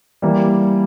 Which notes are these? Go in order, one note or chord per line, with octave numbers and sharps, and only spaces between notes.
E3 G3 A#3